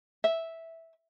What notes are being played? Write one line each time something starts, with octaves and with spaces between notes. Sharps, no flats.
E5